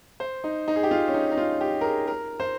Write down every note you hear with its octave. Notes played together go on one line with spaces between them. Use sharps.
C5
D#4
D#4
G#4
G4
F4
C#4
D#4
D#4
F4
G4
A#4
G#4
A#4
C5